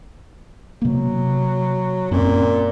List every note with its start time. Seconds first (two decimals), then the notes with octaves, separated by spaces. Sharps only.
0.82 C3 F#3 A#3
2.11 F#2 A#2 C4 C#4